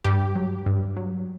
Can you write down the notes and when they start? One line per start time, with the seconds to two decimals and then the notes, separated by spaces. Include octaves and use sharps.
0.04 G2 G4
0.36 F#3
0.66 G2
0.96 F#3